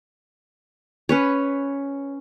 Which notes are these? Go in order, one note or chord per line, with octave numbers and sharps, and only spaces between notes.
C#4 B4 C#5